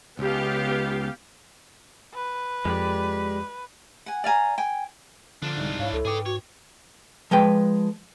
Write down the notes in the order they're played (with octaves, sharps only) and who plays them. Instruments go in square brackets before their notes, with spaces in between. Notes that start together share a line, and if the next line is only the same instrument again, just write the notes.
[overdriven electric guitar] C#2 [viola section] B3 G4 F5
[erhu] B4
[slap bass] F2 [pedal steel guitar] G#3 G4 D5
[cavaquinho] F#5 G#5
D5 F5 G#5 A#5
G5 G#5
[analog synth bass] D3 [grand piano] F3 [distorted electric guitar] D4 F4
[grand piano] C2 G#2
[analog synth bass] G#2 [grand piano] E4 C#5 [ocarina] F5
[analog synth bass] C#2 [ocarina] A4
[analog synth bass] G#2 [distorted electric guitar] G#4 C#5 [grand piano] B4 G5 D6
[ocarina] F#4 [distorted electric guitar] C#5
[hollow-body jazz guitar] F3 G#3 B4 G5